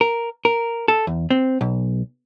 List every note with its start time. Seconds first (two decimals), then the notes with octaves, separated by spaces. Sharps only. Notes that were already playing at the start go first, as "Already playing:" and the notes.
0.01 A#4
0.45 A#4
0.88 A4
1.07 E2
1.30 C4
1.61 B1